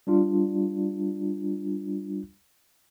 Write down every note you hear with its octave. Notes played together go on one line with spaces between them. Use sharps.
G3 D4 F4